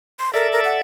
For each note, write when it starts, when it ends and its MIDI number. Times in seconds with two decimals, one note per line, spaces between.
0.19 0.32 84
0.34 0.81 69
0.34 0.48 70
0.34 0.81 74
0.34 0.81 76
0.52 0.60 70
0.65 0.79 78